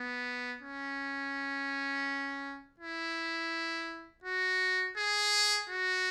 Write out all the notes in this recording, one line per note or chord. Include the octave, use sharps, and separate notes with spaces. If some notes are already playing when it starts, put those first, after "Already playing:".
Already playing: B3
C#4
E4
F#4
G#4
F#4